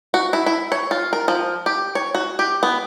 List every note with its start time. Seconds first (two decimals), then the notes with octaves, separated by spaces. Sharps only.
0.14 F#4
0.33 E4
0.46 E4
0.72 C#5
0.91 F4
1.13 A#4
1.28 F3
1.66 G4
1.95 C#5
2.15 F#4
2.39 G4
2.63 B3